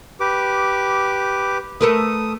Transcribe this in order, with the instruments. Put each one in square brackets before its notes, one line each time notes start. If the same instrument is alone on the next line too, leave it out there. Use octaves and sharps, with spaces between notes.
[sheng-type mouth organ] G4 B4 D6
[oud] A3 A#4 B4 [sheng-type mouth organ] D#6